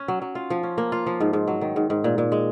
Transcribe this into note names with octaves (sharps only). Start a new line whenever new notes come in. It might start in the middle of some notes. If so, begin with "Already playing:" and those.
Already playing: C#4
F#3
F#3
F4
F3
C#4
A#3
F4
F3
G#2
G#2
F#3
D#3
G#2
G#2
A#2
A#2
G#3